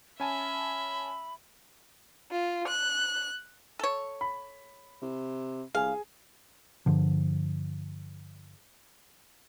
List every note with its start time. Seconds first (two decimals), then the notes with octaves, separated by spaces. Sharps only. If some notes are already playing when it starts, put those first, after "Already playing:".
0.20 C#4 E5 G#5 A5 B5
2.31 F4
2.67 F#6
3.79 A4 C#5
4.21 B5
5.02 C3
5.75 C2 G#4 F5 G#5
6.86 G2 D3 F3